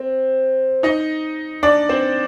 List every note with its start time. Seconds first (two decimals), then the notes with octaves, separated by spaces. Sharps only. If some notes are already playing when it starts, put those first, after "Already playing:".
Already playing: C4
0.83 D#4 D#5
1.63 D4 D5
1.89 C4 C5